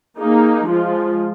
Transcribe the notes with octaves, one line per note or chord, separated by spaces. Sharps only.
A#3 D#4 G#4
F3 G#3 F4